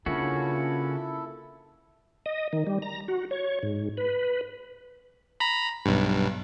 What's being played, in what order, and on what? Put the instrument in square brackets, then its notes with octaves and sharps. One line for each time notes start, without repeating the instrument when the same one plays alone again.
[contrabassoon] A#2 [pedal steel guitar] C#3 C#4 F#4 [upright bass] D4 [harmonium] E4 A4
[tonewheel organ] D#5
D#3
G3
A#5
F#4
C#5
G#2
B4
[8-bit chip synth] A#5 B5
B1 G2